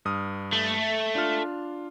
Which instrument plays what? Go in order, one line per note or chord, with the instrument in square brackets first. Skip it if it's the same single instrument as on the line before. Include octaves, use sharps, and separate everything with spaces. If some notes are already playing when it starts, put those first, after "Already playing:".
[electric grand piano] G2 D#6 F6
[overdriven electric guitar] A3
[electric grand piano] D4 F4 F6